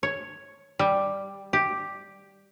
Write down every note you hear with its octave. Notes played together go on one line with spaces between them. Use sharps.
C#5
G3
G4